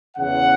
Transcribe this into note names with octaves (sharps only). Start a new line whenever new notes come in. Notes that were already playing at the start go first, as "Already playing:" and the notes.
E2 C#3 E3 F#5